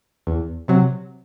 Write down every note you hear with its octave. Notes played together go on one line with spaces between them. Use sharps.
E2
C3 F#3